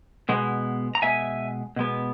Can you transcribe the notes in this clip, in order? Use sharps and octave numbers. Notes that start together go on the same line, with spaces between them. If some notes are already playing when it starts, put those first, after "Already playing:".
B2 G#3 B3
A#5
B2 G#3 B3 E5 G#5
B2 G#3 B3